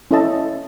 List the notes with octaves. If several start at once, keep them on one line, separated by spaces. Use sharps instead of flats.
C#4 E4 A4 D#5 A5